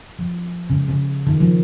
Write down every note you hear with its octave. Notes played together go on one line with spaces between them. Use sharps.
F3
C#3
C#3
D#3
F3